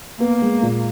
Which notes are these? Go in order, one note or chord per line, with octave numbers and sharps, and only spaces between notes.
A#3 B3
G#3
A#2